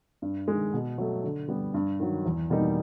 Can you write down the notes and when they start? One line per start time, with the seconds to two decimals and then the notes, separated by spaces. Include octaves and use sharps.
0.22 G2
0.48 D#3 G#3
0.73 B2
0.98 F#3 A3
1.24 D3
1.48 G3 B3
1.74 G2
2.00 D#3 F#3
2.26 E2
2.50 B2 G3 A#3 D#4